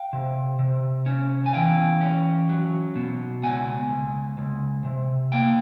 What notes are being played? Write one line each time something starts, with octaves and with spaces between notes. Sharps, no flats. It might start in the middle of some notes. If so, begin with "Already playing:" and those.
Already playing: F5 G5
C3
C3
C#4
G#5
E3 F5 G5
C#4
F#3
B2
C#2 F#5 G#5
C#2
C#2
C3
A#3 F5 G5